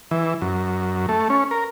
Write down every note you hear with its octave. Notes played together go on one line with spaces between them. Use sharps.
E3
F#2
A3
C#4
A#4